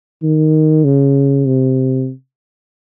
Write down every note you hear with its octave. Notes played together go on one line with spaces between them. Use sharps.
D#3
C#3
C3